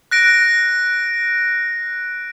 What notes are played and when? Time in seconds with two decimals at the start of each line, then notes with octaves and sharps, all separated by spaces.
0.11 F#6 A#6 D7